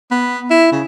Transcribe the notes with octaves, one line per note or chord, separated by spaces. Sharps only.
B3
E4
C#3